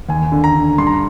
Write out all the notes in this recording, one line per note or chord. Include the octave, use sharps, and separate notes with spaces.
D#2 G#5
D3
A#5
D3
G2 C6
A#5